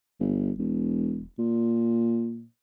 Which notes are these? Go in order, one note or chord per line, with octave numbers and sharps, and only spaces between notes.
G1
E1
A#2